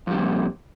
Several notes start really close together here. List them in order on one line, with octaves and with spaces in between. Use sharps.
F2 G3 C#3 A#2